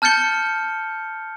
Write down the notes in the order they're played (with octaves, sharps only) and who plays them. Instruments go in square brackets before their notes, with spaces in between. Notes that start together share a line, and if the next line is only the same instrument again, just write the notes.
[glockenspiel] A5 F6 G6 A6 C#7 G7